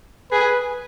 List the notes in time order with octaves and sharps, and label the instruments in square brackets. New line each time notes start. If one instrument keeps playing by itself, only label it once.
[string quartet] G#4 [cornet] B4